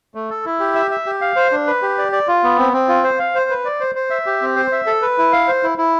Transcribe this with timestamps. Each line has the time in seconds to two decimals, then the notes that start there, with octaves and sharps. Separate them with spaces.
0.15 A3
0.30 A4
0.45 E4
0.60 G4
0.75 E5
0.91 E5
1.06 G4
1.21 F5
1.36 C5
1.52 D4
1.67 B4
1.82 G4
1.98 D5
2.12 D5
2.28 F4
2.44 B3
2.58 C4
2.73 C4
2.88 F4
3.04 C5
3.19 F5
3.35 C5
3.50 B4
3.65 D5
3.80 C5
3.95 C5
4.10 E5
4.26 G4
4.42 C4
4.56 C5
4.72 E5
4.87 A4
5.02 B4
5.18 E4
5.32 F5
5.48 C5
5.63 E4
5.78 E4